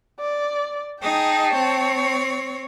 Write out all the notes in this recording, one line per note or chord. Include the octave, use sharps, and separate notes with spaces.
D5
D#4 G#4 G5 A5
C4 C#5